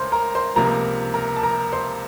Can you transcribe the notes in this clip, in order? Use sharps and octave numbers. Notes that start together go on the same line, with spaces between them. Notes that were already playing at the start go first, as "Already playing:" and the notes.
Already playing: C#2 C#3 C#4 A#4 C5 C6
A#4 A#5
C5 C6
C#2 C3 F3 A#3 A#4 A#5
A#4 A#5
A5
A#4 A#5
C5 C6